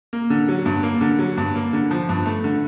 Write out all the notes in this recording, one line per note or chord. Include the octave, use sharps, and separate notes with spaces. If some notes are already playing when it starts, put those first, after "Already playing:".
A#3
D3
F#3
G2
A#3
D3
F#3
G2
A#3
D3
F3
G2
A3
D3